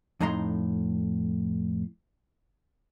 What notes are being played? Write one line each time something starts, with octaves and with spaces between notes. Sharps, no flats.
F2 A2 D#4 A#5 C6